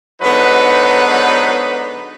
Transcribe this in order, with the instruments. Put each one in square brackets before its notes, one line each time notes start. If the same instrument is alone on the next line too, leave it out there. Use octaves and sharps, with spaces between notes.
[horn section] G#2 D3 F#3 B3 D#4 B4